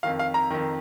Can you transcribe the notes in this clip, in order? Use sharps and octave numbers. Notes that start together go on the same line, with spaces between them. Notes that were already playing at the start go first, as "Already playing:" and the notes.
F2 D#3 F5
F5
A#5
F2 D#3